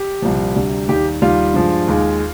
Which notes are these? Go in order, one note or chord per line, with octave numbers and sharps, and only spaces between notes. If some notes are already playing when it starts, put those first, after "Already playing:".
Already playing: G4
C2 A#2 F3
D2 C3 G3
D#2 D#3 G3 G4
D#2 D#3 G3 F4
G2 F3 G#3
D#2 D#3 G#3